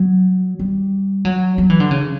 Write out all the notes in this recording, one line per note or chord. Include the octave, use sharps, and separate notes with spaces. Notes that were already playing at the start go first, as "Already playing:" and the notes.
Already playing: F#3
G3
F#3
F#3
E3
D3
C#3